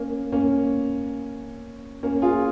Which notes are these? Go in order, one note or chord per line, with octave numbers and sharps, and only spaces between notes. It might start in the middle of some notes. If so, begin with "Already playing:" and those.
Already playing: A#3 C#4
A#3 C#4
A#3 C#4
F4 G#4